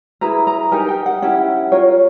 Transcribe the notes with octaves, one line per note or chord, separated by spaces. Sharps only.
E4 G#4 B4 A#5
A#5
D#4 G4 A#4 G#5
G5
F#5
C#4 E4 G4 F#5
F4 A#4 C#5